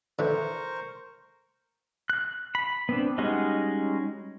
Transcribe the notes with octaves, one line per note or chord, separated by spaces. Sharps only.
D3 E3 A#4 C5 C#6
F#6
B5
B3 C4 D4
G3 G#3 C#4 D#4 F#4